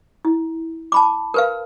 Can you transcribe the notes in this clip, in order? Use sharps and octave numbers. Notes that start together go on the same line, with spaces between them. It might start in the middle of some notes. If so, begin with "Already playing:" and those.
E4
A5 B5 D6
A#4 B4 F5